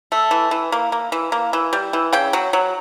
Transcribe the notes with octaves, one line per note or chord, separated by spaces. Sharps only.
A3
E3
E3
A#3
A#3
E3
A#3
E3
G3
E3
C#3 G5
F#3
F#3